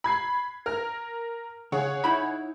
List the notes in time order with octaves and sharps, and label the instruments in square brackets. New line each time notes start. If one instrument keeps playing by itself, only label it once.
[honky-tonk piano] B5 G#6 C7
A#4 F6
[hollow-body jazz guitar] C#3 [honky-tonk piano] G#4 C#5 F#5
[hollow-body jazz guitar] D#4 E4 B5